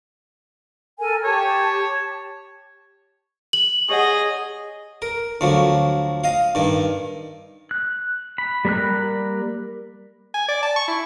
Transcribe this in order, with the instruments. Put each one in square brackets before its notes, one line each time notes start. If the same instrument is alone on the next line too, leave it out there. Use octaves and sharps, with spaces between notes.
[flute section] A4 A#4 G#5
[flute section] G4 A5 [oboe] C#5
[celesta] F#7
[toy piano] G4 C#5 F#5 [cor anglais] G#4 [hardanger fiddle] D#5
[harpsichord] A#4
D2 F3 F#3
D#5 F5
G2 D#3
[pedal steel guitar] F#6
B5
G3 A#3 A#4 B5 F#6
[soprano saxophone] G#5
D5
A5
C#6
E4